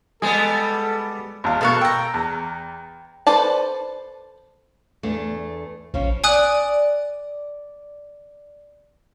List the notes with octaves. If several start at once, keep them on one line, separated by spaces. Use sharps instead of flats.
G3 G#3 B3 G#4 A4
G#1 E2 F5
B2 A#3 A4 F5 C#6 F#6
G5 A#5 E6
E2
A4 B4 C5 D5 A5
E2 A3 D4
A#1 C#3 F3 C#4
D5 G#5 D#6 F#6